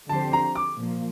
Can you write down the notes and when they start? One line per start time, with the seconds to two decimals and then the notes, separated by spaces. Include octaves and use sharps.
0.09 D3 F3 C4 G4 C5 A5
0.33 A#5
0.55 D6
0.78 A#2 F3 A#3